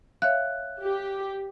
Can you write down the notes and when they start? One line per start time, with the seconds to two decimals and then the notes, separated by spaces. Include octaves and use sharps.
0.22 C#5 E5 F5 F#6
0.82 G4